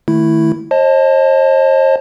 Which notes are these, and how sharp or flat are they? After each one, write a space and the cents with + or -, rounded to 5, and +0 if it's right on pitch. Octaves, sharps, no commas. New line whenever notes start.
D#3 +0 A3 +0 E4 +0
C5 +45 D#5 +0 A5 +0